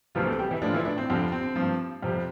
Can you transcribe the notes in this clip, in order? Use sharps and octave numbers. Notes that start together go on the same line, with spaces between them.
D2 C3 E3 F3 G3 F4
A3 A4
G3 G4
E3 E4
A2 F3 D4
F4
E3 E4
D4
C4
F2 D3 G3 C4
C4
G2 F3
F2 C3 G3